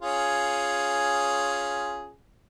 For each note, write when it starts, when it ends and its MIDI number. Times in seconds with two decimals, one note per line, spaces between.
0.02 2.12 61
0.02 2.12 65
0.02 2.12 68